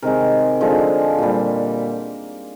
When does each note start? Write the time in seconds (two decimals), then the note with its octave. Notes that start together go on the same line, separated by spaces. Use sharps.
0.02 C3 D#3 G#3 A#4
0.61 D3 F3 G#3
1.18 A#2 G3